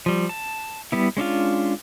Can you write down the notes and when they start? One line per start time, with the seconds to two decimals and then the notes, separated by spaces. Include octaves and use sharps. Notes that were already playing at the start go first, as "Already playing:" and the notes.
0.06 F3 G3
0.29 A5
0.92 G3 B3 E4
1.17 G#3 C#4 D4 F4